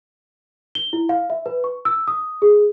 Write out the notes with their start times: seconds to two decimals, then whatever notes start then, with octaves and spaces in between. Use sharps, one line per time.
0.75 G7
0.93 E4
1.09 F5
1.30 E5
1.46 B4
1.64 C#6
1.85 E6
2.08 D#6
2.42 G#4